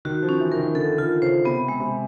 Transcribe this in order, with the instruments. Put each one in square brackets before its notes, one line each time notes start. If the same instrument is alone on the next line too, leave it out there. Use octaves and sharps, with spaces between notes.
[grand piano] D#3 [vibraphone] F#4
[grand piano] F3
[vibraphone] C#4
[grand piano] E3
[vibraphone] A#4
[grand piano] D#3
[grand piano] D3 [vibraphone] A4
[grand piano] D3 [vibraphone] F4
[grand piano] C#3 [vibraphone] C5
[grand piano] C3 [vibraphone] B3
[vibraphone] G#3
[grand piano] C3